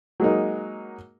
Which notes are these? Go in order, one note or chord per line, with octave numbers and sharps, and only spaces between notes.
F#3 G#3 A#3 D#4